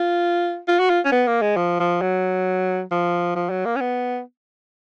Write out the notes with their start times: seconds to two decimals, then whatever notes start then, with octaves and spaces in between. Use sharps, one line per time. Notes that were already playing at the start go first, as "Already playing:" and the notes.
Already playing: F4
0.68 F4
0.79 F#4
0.90 F4
1.05 C#4
1.12 B3
1.27 A#3
1.42 G#3
1.57 F3
1.80 F3
2.01 F#3
2.91 F3
3.35 F3
3.50 F#3
3.65 A#3
3.76 C#4
3.80 B3